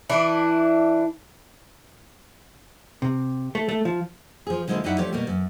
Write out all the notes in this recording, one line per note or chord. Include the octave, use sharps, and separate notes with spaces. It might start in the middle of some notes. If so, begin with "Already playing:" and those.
E3 D4 E4
C3
A3
A3
F3
F3 G#4
D3 F3 G#3 A#3 E4
F#2 D#4 E4 D5 E5 F#5
F3 A3 D4 G4 C#5 D5
B2 G3 A#3
F#2